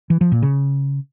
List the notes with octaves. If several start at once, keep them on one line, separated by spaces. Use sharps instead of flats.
E3
F3
A#2
C#3